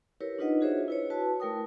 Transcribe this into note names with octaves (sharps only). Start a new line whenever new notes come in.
E4 G4 A#4 B4 C#5
D4 D#4 F4 B4 D#5 F#5
F4 F#4 G#4 C5 C#5 E5
E4 B4 C#5
E4 F#4 B4 A5
A3 E4 A#4 G5 D#6